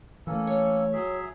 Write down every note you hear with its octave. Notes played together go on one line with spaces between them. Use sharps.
E3 A3 A#3 C#4 A4
C#5
F#3 G#4 E5